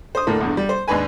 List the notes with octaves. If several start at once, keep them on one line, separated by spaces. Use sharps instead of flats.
C5 D#6
D2 A2 D3 A3 A#3
B1 E2 G2
G3
C5
D#2 G#2 D4 B4 G#5